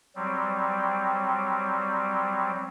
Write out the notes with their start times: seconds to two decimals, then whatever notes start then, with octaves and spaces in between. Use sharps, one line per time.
0.16 F#3 G3 C4